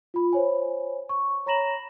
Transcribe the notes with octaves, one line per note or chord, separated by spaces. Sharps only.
F4 B5
C5 C#5 G#5
C#6
C#5 A#5 B5 A#6 E7 F#7